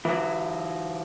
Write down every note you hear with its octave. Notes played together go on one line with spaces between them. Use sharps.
E3 F#3